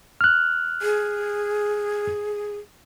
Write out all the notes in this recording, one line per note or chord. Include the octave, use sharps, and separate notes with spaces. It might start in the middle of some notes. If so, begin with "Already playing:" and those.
F6 F#6
G#4